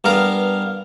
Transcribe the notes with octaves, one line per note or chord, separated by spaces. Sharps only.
G2 B3 A#4 F5